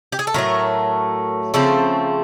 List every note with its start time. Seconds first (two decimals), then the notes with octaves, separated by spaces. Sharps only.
0.12 G4
0.19 G#4
0.27 A4
0.34 A2 F#3 A3 A#4
1.54 C#3 F3 A3 C4 A4